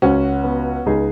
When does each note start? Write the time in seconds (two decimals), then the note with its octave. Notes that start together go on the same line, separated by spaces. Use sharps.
0.02 C#2 C#4 F#4
0.44 B3
0.86 C#2 D#4 G#4